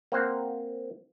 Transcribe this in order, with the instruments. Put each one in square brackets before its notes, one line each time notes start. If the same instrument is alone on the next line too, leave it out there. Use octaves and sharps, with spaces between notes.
[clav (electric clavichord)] A#3 C4 C5 F#5